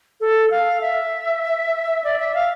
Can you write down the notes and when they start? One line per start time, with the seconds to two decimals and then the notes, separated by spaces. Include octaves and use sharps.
0.21 A4
0.51 F5
0.81 E5
2.04 D5
2.19 E5
2.34 F5